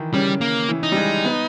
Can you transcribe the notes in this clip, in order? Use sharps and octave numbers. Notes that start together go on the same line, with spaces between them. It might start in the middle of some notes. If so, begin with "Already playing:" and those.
Already playing: D#3 E3
C#3 G3
A#3
E3
D#4
G3
G#3
B3